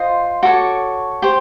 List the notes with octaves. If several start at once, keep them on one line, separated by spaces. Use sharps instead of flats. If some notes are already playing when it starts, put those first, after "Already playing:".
Already playing: F4 C5 D#5
F#4 A4 C#5 D6
G4 C5